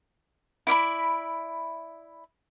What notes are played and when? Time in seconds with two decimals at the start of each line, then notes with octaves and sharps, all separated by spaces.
0.67 E4 D5 E5 B5